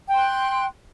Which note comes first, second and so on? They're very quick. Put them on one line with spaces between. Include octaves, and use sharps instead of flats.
G5 C6 F#6